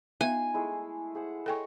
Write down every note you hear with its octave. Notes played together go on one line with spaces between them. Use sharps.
B3 D#4 F4 E5 G#5 C6
G#3 A3 E4
G#4 C5 F#5
A4 C#5 D#5 G5 G#5